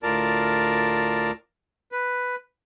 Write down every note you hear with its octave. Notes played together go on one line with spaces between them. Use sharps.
D2 A2 F4 A#4 D5 A5
B4